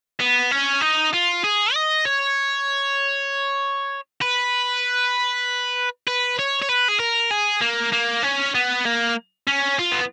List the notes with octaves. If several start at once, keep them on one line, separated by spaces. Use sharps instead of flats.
B3
C#4
D#4
F4
G#4
D#5
C#5
B4
B4
C#5
C#5
B4
G#4
A#4
G#4
A#3
A#3
C#4
B3
A#3
C#4
F4
B3